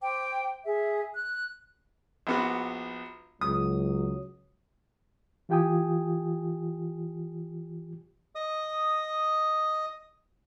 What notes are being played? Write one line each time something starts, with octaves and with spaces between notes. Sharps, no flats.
C5 G5 D6
G#4 E5
F#6
A#1 B3 F#4
C#2 F#3 D#6
E3 F4 G4 G5 G#5 D#6
D#5 D#6